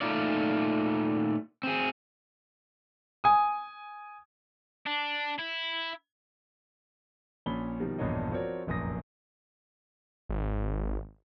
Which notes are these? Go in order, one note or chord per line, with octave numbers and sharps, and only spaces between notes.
A#2 A3 D#4 F4 D5
C4 G#4
G#5 D#6
D4
E4
A#1 A#2 C#4 B5 G7
B2 D#3 F3 G3
E1 A#1 G2 B3 C#5 D#5
F3 C4 F#4 A#4 C#5 D5
F1 A#1 F#2 D#6 A#6
G#1